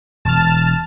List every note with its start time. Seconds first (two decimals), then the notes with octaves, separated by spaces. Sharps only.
0.25 E1 A5 F6